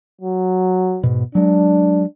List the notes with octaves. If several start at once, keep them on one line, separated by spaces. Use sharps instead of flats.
F#3
G#2 B2
F#3 G#3 D4